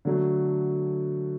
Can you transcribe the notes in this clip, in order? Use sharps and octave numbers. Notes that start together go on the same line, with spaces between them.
D3 F#3 A3